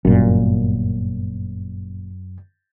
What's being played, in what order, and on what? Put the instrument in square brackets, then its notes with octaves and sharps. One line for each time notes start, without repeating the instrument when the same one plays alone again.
[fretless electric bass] G1 A#2 [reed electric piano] F#2